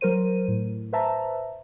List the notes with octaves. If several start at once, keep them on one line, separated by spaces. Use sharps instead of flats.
F#3 A#4 C5 D#7
A2
B4 C5 E5 A5 A#5